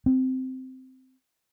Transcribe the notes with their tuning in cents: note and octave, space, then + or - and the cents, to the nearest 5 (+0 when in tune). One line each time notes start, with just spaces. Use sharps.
C4 -10